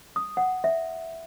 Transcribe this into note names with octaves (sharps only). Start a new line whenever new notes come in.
D#6
F#5
E5